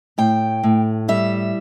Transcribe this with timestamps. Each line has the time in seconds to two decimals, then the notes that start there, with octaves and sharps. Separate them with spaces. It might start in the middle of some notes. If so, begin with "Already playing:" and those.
0.18 A2 G5
0.63 A2
1.08 G3 E5